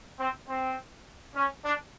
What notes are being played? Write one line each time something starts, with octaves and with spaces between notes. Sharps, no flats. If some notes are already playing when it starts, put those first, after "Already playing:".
C4
C4
C#4
D4